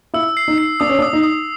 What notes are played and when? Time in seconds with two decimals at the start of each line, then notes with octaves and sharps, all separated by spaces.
0.14 E4 E6
0.37 C7
0.48 D#4
0.58 C7
0.80 D4 D#6
0.89 C#4
0.99 D4
1.02 D#6
1.13 D#4
1.23 D#6